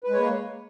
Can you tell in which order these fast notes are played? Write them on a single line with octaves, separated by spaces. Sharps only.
B4 G#3 C#5 A#3